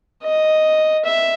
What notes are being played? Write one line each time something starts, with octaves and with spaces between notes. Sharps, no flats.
D#5
E5